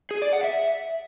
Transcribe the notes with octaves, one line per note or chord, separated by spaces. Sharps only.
G#4
D5
F#5
E5